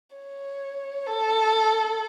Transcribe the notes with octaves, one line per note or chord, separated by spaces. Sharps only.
C#5
A4